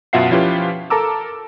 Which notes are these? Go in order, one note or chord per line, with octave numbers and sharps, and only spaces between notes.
F#2 B2 F4 E5 F#5 C7
F3 C#4 E4 F4 G4 B4
A4 A#4 A5 A#5 D6 E6